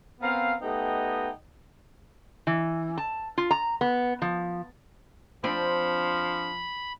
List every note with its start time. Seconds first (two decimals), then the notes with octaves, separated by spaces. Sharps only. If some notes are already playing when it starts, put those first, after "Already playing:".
0.21 B3 C4 A#4 F5
0.61 A3 B3 D#4 G4 D#5 G5
2.47 E3
2.98 A5
3.38 F4
3.51 A#5
3.81 B3
4.22 F3
5.44 F3 C4 D4 B5